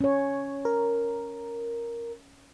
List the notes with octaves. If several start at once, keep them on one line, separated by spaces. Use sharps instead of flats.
C#4 C#5
A#4